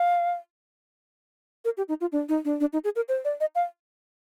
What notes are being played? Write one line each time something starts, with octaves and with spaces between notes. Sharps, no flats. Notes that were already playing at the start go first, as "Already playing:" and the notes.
Already playing: F5
A#4
G4
D#4
F4
D4
D#4
D4
D4
D#4
G#4
A#4
C5
D5
D#5
F5